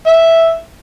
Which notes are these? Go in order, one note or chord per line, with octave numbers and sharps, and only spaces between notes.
E5